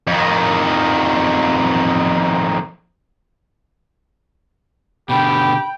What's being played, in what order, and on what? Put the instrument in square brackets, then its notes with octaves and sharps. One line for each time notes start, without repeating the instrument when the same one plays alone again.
[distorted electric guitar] F2 D#3
[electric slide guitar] B2 D3 [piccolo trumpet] G4 [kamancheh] G5 [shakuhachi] B5